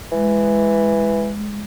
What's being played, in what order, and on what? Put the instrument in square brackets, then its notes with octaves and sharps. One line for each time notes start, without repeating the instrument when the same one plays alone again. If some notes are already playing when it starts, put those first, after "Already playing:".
[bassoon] E3 [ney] G#3